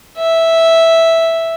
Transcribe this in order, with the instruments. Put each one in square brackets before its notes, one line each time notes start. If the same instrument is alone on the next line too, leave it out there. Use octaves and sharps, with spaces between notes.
[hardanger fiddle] E5